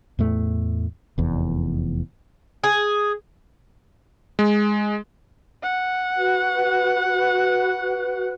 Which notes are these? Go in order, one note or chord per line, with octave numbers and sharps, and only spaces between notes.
E2 A2 A3
F1 E2
G#4
G#3
F#5
F#4 B4 F#6